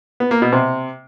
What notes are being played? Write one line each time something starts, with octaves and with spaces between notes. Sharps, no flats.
B3
A#3
B2
C3